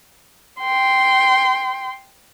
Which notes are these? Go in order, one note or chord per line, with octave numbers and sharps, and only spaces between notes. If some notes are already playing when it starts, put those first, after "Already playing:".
G5 C6